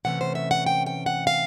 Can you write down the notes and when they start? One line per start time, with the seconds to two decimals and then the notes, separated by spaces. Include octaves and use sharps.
0.05 C3 E3 A3 C#4 F#5
0.21 C5
0.35 E5
0.51 F#5
0.66 G5
0.86 G5
1.06 F#5
1.27 F5